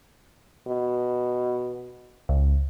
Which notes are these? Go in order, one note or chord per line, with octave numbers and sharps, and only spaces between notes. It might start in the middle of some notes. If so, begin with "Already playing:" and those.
B2
C#2